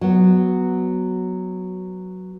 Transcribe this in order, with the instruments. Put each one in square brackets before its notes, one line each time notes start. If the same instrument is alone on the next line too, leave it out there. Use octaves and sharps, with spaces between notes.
[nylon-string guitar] F#3 B3